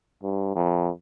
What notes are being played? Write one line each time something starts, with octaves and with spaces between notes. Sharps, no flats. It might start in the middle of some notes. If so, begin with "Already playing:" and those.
G2
F2